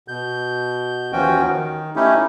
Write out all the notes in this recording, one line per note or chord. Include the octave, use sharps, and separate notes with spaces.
B2 G6
D#2 E3 F3 C#4 F#4 G5
D#3
A3 C#4 D#4 E4 G4